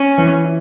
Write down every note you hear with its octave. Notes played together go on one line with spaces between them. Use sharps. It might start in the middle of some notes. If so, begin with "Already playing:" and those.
Already playing: C#4
E3
E4